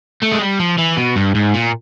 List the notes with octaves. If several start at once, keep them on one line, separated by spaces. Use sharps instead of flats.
A3
G#3
G3
F3
E3
B2
G2
G#2
A#2